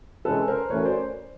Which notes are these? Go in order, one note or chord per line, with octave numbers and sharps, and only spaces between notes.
C3 E3 G#3 C#4 A4 B4
A#4 C5
E3 A3 C#4 F#4 A#4 B4 C#5
C5 D5